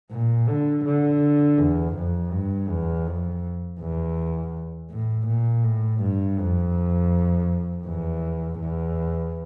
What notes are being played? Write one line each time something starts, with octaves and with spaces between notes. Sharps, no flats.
A#2
D3
D3
E2
F2
G2
E2
F2
E2
A2
A#2
A2
G2
F2
E2
E2